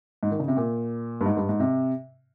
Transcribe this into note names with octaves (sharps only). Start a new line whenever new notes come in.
G#2
D#3
C#3
C3
A#2
G2
G#2
G2
G#2
C3